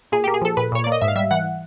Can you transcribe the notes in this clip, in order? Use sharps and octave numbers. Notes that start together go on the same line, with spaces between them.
A#2 G#4
A#3 G4
G#4
F3 A4
A#2 B4
A#2 C#5
A#3 D5
D#5
G#2 E5
F5
G3 E5
E3 F#5